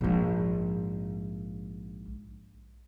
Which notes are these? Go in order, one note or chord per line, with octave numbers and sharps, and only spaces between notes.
A#1 G#2